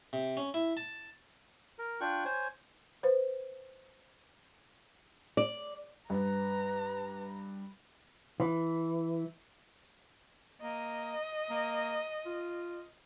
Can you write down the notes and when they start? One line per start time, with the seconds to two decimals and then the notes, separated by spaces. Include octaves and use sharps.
0.13 C3
0.37 C#4
0.54 E4
0.77 A5
1.79 A#4
2.01 D4 F4 G5 C#6 F#6
2.25 C5 C#5 G#5
3.03 B4 C5
5.37 D5
6.10 G2 B4 A#5
8.40 E3
10.62 A#3 D#5
11.50 A#3
12.26 F4